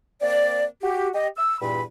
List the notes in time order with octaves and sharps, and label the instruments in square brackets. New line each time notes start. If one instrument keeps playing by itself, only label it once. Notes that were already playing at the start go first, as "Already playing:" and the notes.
[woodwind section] A#3 C4 D5
F#4 G4
G4 D#5
E6
E2 G2 A#2 B5